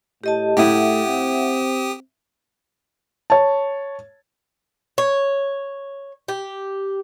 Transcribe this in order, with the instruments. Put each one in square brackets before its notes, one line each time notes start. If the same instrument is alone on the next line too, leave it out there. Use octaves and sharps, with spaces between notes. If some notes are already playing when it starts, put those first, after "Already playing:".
[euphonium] A2 [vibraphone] G4 D#5 A5
[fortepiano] A2 E4 [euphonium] A3 [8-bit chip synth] G4 D#6 [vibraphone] E5 F#5
[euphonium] C4
[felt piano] C#5 A5
[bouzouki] C#5
G4